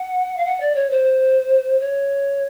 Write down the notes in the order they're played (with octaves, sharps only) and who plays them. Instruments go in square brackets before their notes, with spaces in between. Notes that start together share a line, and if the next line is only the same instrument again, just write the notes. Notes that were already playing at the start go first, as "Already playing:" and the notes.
Already playing: [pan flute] F#5
F5
F#5
D5
C#5
C5
C#5